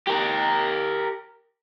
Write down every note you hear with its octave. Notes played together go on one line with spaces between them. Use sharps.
G4 A#4